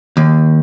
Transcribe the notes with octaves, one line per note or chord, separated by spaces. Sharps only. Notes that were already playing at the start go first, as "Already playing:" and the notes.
D#2